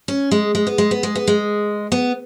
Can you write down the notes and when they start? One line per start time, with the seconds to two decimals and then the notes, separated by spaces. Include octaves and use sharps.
0.08 C#4
0.31 G#3
0.55 G#3
0.67 B3
0.78 G#3
0.91 B3
1.03 G#3
1.15 B3
1.27 G#3
1.92 B3